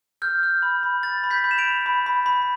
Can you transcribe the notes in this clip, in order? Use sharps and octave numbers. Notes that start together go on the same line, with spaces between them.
F6 G6
F6
B5
B5
B5 A6
B5
G6 B6
B5
E7
D7 F7
B5
B5
B5
B5